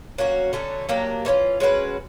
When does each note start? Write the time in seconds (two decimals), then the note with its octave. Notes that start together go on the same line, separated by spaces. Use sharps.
0.18 F#3 A#3 C#4 F#4
0.53 D3 F#3 A3 C#4
0.89 F#3 A#3 D4 G4
1.25 E3 A3 C#4 F4
1.60 G#3 C#4 F#4 B4